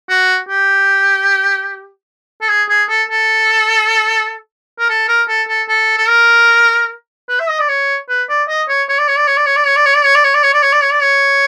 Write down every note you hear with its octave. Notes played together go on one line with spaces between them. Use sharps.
F#4
G4
A4
G#4
G#4
A4
A4
A#4
A4
A#4
A4
A4
A4
A4
A#4
B4
E5
D#5
D5
C#5
B4
D5
D#5
C#5
C#5
D5
C#5
D5
C#5
D5
C#5
D5
C#5
D5
C#5
D5
C#5
D5
C#5
D5
C#5
D5
C#5
D5
C#5
D5
C#5